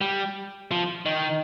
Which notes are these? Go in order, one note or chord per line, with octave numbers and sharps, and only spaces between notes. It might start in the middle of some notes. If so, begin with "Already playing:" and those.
G3
F3
D#3